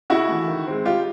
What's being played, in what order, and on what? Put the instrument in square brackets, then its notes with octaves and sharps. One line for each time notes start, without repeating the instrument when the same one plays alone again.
[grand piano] C#3 [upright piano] E4 F#4
[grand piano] E3 A3
D#3
G#3 C4
[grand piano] G3 [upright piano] F4 G4